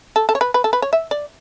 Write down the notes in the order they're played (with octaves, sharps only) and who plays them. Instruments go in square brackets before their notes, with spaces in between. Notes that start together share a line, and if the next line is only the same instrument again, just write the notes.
[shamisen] A4
A4
C#5
B4
B4
A4
B4
C#5
E5
D5